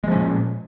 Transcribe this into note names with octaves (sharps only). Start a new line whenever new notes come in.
A#2 F3 G#3 C#4